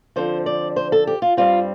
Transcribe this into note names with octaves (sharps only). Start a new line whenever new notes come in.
D3 F3 C4 C5
D5
C5
A4
G4
F4
G2 G3 C4 F4